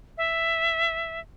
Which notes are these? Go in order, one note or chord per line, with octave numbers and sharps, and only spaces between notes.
E5